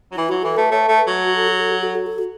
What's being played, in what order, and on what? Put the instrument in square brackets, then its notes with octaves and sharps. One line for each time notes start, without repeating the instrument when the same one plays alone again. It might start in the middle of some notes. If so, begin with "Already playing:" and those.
[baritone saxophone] F#3
[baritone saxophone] E3 [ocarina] E4
[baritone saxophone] F#3 [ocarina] F#4
[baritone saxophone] E3 [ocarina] A4
[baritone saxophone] A3 [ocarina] B4
[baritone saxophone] A3 [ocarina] C#5
[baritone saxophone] A3
[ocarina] B4
[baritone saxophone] F#3
[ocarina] F#4
A4
F#4
A4
F#4
A4
F#4
A4
F#4